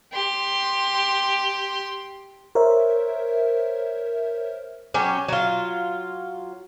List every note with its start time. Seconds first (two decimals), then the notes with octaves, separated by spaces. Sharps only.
0.13 G4 C6
2.55 A#4 C5 C#5 E5
4.94 F#3 C#4 G4
5.28 F#3 F4